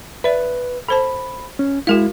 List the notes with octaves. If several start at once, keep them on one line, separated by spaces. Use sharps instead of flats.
B4 D5 E5
A4 C5 A5 B5
C#4
G#3 E4 F#4 A#4 F5